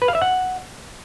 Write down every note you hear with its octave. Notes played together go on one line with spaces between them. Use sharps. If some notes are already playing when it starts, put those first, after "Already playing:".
B4
F5
E5
F#5